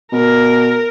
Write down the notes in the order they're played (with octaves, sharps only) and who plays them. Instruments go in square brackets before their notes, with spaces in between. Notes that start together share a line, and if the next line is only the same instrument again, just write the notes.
[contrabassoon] B2 [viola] A#4